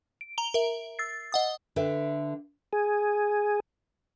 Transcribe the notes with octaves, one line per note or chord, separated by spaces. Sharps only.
D7
A#5 F7 G7
A#4 E5
E6 A6 C7
D#5 F#5 D#6
D3 B4 E5 G5
G#4